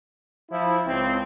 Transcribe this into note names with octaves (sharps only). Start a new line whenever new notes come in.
F3 E4
C#2 C4